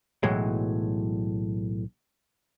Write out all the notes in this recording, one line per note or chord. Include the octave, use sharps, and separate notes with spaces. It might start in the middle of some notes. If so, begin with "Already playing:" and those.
B1 A2 E3 F#3 G#3